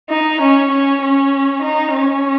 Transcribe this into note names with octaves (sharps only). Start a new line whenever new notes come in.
D#4
C#4
C#4
C#4
D#4
C#4